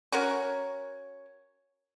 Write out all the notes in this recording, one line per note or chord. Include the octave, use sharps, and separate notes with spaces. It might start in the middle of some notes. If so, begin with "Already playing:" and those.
C#4 F#4 A#4 C#5